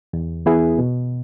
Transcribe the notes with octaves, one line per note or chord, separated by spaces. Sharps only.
E2
E3 B3 E4 G#4
B2